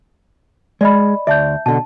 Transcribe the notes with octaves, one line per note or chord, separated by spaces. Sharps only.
G#3 D5 D#5 B5
D2 D5 E5 A5 G6
B2 D3 A5